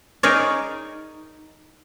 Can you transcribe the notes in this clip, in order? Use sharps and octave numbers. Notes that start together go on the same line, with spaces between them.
D#4 G#4 A#4 C#5 D5